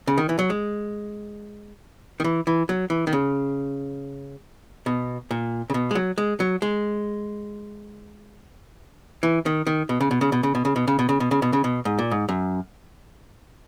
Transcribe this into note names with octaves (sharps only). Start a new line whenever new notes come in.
C#3
D#3
E3
F#3
G#3
D#3
E3
E3
F#3
E3
D#3
C#3
B2
A#2
C#3
B2
G#3
F#3
G#3
F#3
G#3
E3
D#3
D#3
B2
C#3
B2
C#3
B2
C#3
B2
C#3
B2
C#3
B2
C#3
B2
C#3
B2
C#3
B2
G#2
A#2
G#2
F#2